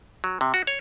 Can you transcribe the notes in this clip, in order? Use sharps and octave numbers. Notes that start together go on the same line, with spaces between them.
F#3
C3
F#4
C#5